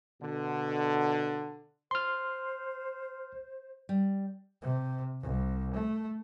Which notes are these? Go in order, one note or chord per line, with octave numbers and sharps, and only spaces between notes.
B2 D3
C5 C6 F6
G3
C3
C2
A3